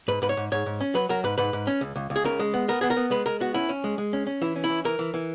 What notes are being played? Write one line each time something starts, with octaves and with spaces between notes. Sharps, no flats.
G#2 B4
G#2 B4
C#5
G#2
G#2 C#5
G#2
C#4
F#3 B4
F#3 A#4
G#2 B4
G#2 B4
G#2
C#4
C#2
C#2
C#2
G#4
C#3 A#4
G#3
B3
B3 A#4
B3 G#4
A#4
B3
G#3 B4
G#3 A#4
B3 F#4
C#4 E4
C#4
G#3
G#3
C#4
C#4
E3 E4
C#4
E4
E3
E3 A#4
E3
E3